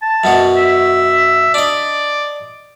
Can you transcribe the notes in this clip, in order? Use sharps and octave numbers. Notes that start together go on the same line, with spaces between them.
A5
F#2 B2 F#3
E5
D4 D5 D#5